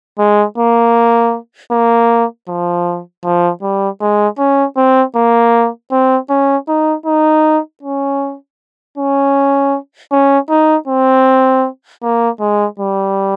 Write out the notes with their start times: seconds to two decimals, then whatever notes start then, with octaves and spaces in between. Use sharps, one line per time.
0.19 G#3
0.58 A#3
1.72 A#3
2.48 F3
3.24 F3
3.62 G3
4.01 G#3
4.38 C#4
4.77 C4
5.16 A#3
5.92 C4
6.30 C#4
6.69 D#4
7.06 D#4
7.83 C#4
8.98 C#4
10.12 C#4
10.50 D#4
10.88 C4
12.03 A#3
12.40 G#3
12.79 G3